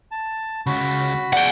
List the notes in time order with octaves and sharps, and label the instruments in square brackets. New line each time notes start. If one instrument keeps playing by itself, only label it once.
[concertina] A5
[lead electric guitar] C#2 C#3 [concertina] F#4 B5
[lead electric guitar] G#4 D5 [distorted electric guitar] F#5 G5